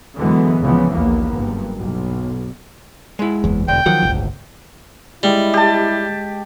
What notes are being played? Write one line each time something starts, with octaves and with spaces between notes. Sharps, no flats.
F#2 D3 E3 G#3 B3
C#2 A#2 C#3 E3 F3 B3
A#1 D#2 A#3 B3
F#1 G2
B1
G#3 E4
F#1 E2
E1 D2 G5
D#3 F3 F#3 F#5
D1 G1 C#2
G3 G#3 E4
G4 A5